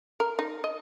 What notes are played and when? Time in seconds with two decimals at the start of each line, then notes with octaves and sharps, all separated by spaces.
0.20 A#4
0.39 D#4
0.64 D#5